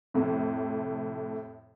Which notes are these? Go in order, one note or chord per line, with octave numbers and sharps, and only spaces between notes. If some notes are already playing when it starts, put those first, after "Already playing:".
F2 A2 C3